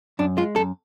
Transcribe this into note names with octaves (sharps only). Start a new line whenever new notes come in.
F#2 D4
G#3 F4
F#2 A4